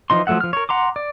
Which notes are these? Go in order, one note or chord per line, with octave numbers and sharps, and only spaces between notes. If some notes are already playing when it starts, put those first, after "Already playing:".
E3 F3 D#4 C6
F3 F#3 A3 E5 F#5
F3 F6
A#4 C#5
F#5 A#5 C6 D6
D5